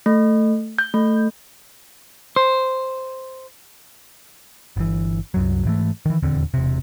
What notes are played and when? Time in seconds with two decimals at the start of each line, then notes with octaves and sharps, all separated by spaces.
0.06 A3
0.79 G6
0.94 A3
2.36 C5
4.76 G1 E3
5.34 C2 F#2 F#3
5.65 G#2 E3 A3
6.06 D#3 E3
6.23 D#1 E2 D3 C4
6.54 E1 C3